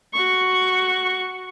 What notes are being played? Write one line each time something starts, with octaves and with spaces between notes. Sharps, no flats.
F#4 C#6